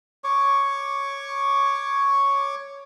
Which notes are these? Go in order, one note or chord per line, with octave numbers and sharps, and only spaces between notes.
C#5 C#6 D6